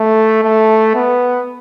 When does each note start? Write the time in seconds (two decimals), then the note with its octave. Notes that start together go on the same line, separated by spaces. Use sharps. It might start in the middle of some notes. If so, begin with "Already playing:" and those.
Already playing: A3
0.43 A3
0.95 B3